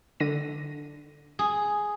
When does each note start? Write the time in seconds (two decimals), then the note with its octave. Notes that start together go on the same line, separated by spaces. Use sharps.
0.20 D3 A#6 D#7
1.39 G#4